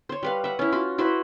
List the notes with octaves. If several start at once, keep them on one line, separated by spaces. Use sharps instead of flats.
C5 C#5
G3 B4 F5
E5 F#5
C#4 E4
F4 F#4
E4 F#4 B4 C5